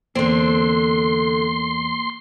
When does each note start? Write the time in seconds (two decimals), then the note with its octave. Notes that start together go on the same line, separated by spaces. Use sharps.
0.16 E2 D3 A#3 C4 C6